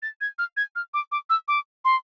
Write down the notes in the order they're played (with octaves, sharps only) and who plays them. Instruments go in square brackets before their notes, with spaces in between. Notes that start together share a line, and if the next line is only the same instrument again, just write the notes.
[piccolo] A6
G#6
F6
G#6
F6
D6
D6
E6
D6
C6